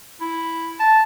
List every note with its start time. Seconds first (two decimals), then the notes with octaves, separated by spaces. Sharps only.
0.21 E4
0.80 A5